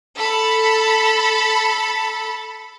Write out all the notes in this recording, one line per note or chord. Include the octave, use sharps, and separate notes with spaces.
A4 A5 B5